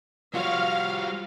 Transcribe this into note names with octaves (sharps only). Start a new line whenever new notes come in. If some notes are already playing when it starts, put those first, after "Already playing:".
G3 F4 F#4 C5 C#5 F5